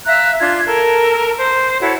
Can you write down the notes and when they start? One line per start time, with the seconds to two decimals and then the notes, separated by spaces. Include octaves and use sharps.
0.06 E5 F5 A#5 F#6
0.39 D4 F4 C6 G#6
0.66 A4 A#4
1.37 C5
1.81 E4 F#4 A4 C#5